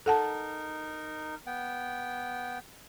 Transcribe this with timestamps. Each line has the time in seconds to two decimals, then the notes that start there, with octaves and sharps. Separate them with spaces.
0.06 D#4 A4 A#4 F#5 A5
1.46 B3 G5